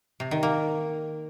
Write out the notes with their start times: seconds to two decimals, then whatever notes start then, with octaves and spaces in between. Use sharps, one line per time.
0.20 C3
0.31 D#3
0.43 A#3